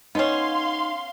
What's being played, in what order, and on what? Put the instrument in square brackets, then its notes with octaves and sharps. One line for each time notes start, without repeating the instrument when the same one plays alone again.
[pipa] B3 C#4 [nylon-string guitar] D#4 [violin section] F5 C6